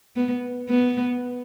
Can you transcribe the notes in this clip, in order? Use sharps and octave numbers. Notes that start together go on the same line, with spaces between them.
B3
B3